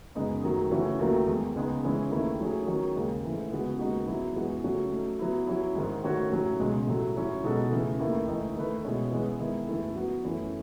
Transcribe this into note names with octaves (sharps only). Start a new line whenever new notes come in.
F#2 C#3 G#3 B3 D#4
F#2 D#3 F#3 A3
C#3 E3 A3 C#4 F#4
D#2 D#3 F#3 A3
E2 D#3 G#3
C#2 C#3 G#3 B3 D#4
C#3 E3 G#3 C#4 E4
D#2 D#3 A3 E4
F#3 A3 C#4 G#4
D#3 F#3 C#4
D#2 C#3 G#3
G#2 E3 A3
C#3 G#3 B3 F#4
D#2 C#3 G#3 D#4 F#4
F#3 B3 E4
F#2 E3 G#3 B3 F#4
C#3 F#3 A3 C#4 F#4
F#3 A3 D#4
F#3 B3 E4
F#3 C#4 E4
G#2 D#3 G#3
D#3 A3 C#4 F#4 C#5
A2 F#3 C#4
C#2 B2 G#3
A2 F#3 A3
F#3 C#4 E4
B2 G#3 D#4 F#4 A4
C#3 E3 A3
D#2 D#3 A3 E4
C#2 C#3 E3 A3 D#4
D#3 A3 E4 B4
B2 G#3 C#4 E4
E3 G#3 B3
D#3 G#3 B3 E4
F#2 E3 A3 E4 A4
F#3 B3 F#4
F#2 E3 A3 C#4 E4